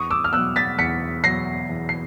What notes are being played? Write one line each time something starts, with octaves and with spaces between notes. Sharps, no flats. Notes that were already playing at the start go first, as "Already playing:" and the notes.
Already playing: E2 C#6 D#6
D6 E6
F6
B2 F#3 E6 F#6
A6 B6
E2 B6 C#7
B2 F#3 A#6 C7
E2
C7